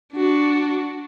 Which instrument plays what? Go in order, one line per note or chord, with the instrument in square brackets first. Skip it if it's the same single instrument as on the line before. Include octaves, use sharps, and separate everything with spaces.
[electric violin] D4 F#4